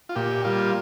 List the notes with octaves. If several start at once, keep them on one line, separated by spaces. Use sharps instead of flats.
F4
A#2 G4
G3 A#3 F4